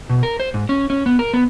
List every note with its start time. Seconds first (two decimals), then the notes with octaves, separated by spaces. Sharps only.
0.10 B2
0.23 A#4
0.40 C5
0.54 G#2
0.69 C#4
0.90 C#4
1.06 B3
1.19 A#4
1.34 B3